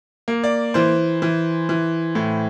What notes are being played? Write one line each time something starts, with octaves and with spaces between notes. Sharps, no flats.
A#3
D5
E3 C5
E3
E3
A2